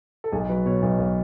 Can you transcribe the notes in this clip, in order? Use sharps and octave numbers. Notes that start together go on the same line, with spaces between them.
A4
B1 G#4
F#3 B4
B2 C#5
B1
B1